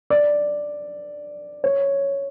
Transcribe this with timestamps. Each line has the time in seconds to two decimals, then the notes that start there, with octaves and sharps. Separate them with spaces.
0.10 D5
1.64 C#5